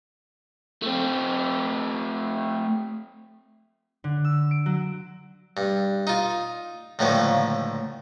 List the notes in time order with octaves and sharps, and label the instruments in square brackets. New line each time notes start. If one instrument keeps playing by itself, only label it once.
[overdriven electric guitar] A3 C4
[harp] D3
E6
D7
F#3
[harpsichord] G2
D#4 F4
C#2 A2 D3 D#3 F3 A#3